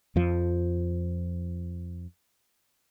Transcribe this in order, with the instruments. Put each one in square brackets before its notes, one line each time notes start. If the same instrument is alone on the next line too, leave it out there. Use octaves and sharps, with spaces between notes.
[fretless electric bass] F2 F3